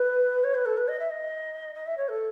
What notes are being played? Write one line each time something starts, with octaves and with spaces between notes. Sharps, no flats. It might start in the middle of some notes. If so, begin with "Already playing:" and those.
Already playing: B4
C#5
B4
A4
B4
D#5
E5
D#5
D#5
E5
C#5
A4